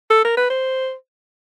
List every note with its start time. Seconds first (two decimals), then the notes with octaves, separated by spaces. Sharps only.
0.11 A4
0.25 A#4
0.37 B4
0.50 C5